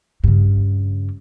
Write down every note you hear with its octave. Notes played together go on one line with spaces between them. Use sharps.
G2 C#3